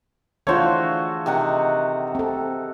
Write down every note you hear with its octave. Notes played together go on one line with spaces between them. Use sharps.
E3 A3 D4 F4 F#4 G#4 C5 C#5
C3 D#3 F#5
C4 A4